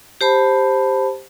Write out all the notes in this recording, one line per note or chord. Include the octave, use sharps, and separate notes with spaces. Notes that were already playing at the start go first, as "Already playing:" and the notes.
G4 C5 A5 B5